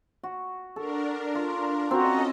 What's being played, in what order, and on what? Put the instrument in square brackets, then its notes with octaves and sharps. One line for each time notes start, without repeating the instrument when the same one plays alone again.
[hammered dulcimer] F#4
[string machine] D4 A#4 [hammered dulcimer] A4
[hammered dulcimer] F4
[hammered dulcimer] C4 [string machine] C#4 A4 D#5 [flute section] F#4 A#5